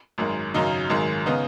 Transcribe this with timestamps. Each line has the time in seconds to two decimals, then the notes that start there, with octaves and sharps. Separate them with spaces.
0.18 G#1 F#2 D#3 G#3
0.54 G#1 F#2 C#3 F#3 D#4
0.90 G#1 F#2 D#3 G#3
1.26 C#3 B3 D#4